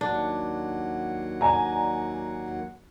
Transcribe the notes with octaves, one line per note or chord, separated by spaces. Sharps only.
D#2 F#3 D4 F#5
D5 G#5 A#5